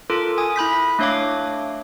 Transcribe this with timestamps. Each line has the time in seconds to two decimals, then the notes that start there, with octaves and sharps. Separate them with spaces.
0.10 F4 A4 A#4 D6
0.38 G#5 D#6
0.56 E4 B5 G6 B6
0.99 A3 D4 C#5 F5 D6